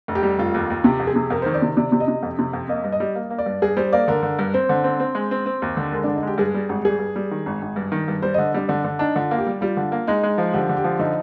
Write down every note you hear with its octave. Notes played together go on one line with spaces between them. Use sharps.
F1
G4
G3
F1 F4
D#2
D#2
C3 G4
F2
G#4
C3
F2 A#4
D#3 C5
D5
C3
C3 D5
C3
D#5
C3
F2
C3
F2
A#3 D#5
G2
D#5
G3
A#3
A#3
D5
G2
G2 G#4
G3 C5
A#3 D5
D3 A#4
D3
G2
C4 C5
D3
C4
C4
G#3
C4
C4
D#2
D3
G#3 A#4
D3 D4
D#4
G#3 G4
G2 G#4
G3
G#1
G3 G#4
G2
G3
D#3
G#1
G#1
G2
D#3
G2
G3 C5
D3 D#5
G3 D4
D3 D4
D3
D4 D#4
D3 F4
A#3
G4
G3
G3 F4
D3
A#3
G#3 D#4
G#3
F3
D3 G4
D3
G4
F3
D3 D#4